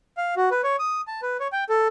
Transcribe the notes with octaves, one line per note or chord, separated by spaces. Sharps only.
F5
F#4
B4
C#5
D#6
A5
B4
C#5
G5
A4